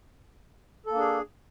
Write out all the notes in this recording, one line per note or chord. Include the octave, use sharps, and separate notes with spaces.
A#3 D4 G#4 A4